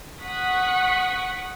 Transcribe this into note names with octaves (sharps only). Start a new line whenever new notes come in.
F#5 C#6 D#6 F#6 B6 C#7